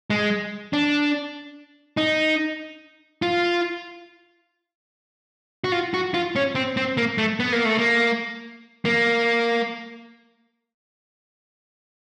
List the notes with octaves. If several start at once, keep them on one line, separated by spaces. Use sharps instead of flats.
G#3
D4
D#4
F4
F#4
F4
F#4
F4
C#4
C4
C4
A#3
A3
B3
A#3
A3
A#3
A#3